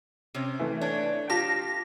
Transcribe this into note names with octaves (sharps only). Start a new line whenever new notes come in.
C3 C4 C#4
E3 A3
D4 C#5
F4 G4 A5 A#6